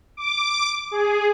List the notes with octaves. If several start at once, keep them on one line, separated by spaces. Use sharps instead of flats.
D6
G#4